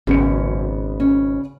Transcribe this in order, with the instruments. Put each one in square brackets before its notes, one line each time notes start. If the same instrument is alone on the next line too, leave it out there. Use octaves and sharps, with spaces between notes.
[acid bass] G#1 [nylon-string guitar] F#2 [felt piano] C#3 B3 C#7
[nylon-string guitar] C#4